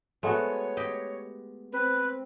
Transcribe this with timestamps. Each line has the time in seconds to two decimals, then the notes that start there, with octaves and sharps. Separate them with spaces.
0.23 G#3 A3 B3 F#4 C#5
0.77 G4 D#5
1.73 C4 B4